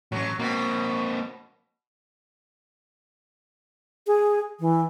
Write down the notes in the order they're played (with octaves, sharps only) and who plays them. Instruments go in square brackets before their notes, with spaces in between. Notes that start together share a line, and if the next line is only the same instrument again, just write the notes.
[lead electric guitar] A2 C#4 [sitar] F#3
[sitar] B2 [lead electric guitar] A#3 C4
[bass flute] G#4
E3